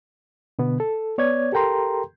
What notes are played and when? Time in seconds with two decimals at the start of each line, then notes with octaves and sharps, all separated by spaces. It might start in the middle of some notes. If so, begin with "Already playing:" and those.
0.59 B2 D3 B3
0.80 A4
1.18 B3 C#5 D5 G#6
1.52 G4 A4 A#4 G5 A#5 C6